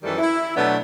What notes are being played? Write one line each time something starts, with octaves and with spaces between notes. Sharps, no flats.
F#2 D#3 E3 G3 A4
E4
B2 F#3 A3 B3 D4